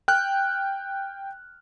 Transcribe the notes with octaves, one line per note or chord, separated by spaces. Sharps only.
G5 F6 F#6